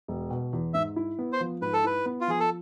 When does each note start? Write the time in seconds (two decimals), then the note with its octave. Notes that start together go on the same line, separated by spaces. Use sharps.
0.08 E1
0.31 B2
0.53 E2
0.74 G#2 E5
0.96 E4
1.19 B3
1.33 C5
1.40 F3
1.61 G#2 B4
1.73 A4
1.84 E4 B4
2.06 B3
2.21 F4
2.28 F3 G#4
2.40 A4